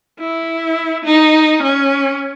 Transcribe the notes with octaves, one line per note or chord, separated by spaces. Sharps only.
E4
D#4
C#4